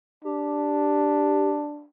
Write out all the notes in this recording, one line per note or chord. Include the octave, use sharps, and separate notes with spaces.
D4 G4